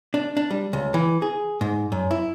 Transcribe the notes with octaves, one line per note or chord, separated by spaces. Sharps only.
D4
D4
G3
C#2
E3
G#4
G#2
F#2
E4